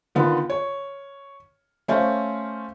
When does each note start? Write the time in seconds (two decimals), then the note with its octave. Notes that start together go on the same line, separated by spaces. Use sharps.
0.15 D3 D#3 B3 F4
0.50 C#5
1.88 A3 C#4 C5 F5